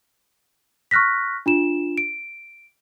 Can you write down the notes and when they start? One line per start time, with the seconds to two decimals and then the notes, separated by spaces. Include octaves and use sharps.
0.91 C#6 F6 F#6 A#6 B6
1.46 D4 F4 E7
1.98 D7